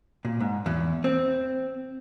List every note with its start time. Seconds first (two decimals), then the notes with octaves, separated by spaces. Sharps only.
0.25 A#2
0.40 G#2
0.66 E2
1.04 C4